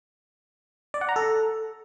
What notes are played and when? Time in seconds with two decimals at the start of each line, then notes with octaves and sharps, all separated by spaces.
0.94 D5
1.01 F#5
1.09 A#5
1.16 A4